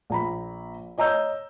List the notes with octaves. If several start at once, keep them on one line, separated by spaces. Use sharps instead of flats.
A#1 A#5 B5
C#5 D#5 A#5 E6 G6